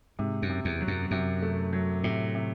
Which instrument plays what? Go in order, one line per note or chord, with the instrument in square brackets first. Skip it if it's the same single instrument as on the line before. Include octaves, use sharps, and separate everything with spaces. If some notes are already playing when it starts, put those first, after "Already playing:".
[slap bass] G#2 [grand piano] C3
[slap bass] F#2
[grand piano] C3
[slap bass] E2
[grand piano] F#3
[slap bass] F#2
[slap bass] F#2 [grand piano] C3
[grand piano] A3
F#3
[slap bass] A2 [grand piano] C3
[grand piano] C3